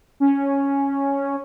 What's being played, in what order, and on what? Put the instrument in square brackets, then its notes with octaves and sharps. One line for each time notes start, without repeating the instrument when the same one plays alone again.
[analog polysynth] C#4